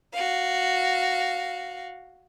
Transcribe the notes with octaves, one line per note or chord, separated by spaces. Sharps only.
F#4 F5